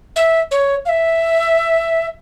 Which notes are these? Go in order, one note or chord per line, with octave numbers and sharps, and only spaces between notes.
E5
C#5
F5
E5